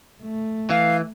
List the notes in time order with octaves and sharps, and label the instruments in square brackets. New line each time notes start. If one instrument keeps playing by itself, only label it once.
[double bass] A3
[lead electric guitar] E3 [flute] F5